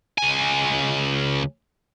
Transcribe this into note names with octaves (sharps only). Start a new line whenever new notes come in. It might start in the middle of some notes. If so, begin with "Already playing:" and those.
C#2 G#5